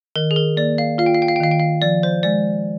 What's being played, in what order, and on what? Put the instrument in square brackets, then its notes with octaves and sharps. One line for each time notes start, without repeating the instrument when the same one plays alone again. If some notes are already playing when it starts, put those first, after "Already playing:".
[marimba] D#3 [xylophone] A#4
[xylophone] G#4
A#4
[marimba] A#3 [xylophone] D5
[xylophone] F5
[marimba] F4 [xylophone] F5
[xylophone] G5
F5
G5
F5
G5
[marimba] D#3 [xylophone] F5
[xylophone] G5
F5
[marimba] F3 [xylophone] D5
[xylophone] C5
[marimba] G#3 [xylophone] D5